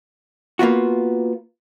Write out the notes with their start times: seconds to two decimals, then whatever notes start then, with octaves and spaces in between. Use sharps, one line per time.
0.59 A#3 B3 F4 F#4